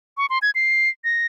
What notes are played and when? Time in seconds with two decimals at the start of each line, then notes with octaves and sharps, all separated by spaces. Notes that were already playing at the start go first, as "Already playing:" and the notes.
0.17 C#6
0.30 C6
0.42 G#6
0.55 C7
1.04 A#6